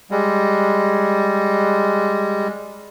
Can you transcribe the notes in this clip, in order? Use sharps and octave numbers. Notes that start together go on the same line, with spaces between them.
G3 G#3